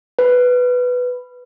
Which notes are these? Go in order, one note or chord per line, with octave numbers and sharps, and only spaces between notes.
B4